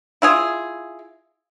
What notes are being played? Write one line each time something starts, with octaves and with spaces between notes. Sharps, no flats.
E4 F4 G#4